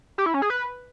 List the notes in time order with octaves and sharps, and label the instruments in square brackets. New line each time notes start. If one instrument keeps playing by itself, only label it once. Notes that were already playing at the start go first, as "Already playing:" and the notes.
[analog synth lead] G4
E4
C#4
G#4
B4